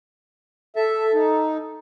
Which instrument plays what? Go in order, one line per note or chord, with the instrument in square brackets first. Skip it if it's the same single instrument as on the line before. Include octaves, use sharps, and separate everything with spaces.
[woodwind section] A4 [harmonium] E5
[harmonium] D#4